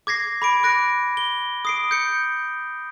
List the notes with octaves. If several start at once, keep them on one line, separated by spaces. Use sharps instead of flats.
D6 G#6 A#6 C7
B5 D6 D7
D6 F#6 A#6 D7
G7
D#6 C7 D7
G6 C#7